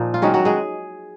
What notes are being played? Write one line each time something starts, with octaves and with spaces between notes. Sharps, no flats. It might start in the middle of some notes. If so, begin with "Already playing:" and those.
Already playing: A#2 F3 D#4
F4
D#3 F#3 G#3 C#4 F#4
F#3 F#4
G#3 G#4